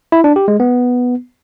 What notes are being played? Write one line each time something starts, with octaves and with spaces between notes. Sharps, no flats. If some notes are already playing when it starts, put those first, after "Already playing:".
E4
D4
G4
G#3
B3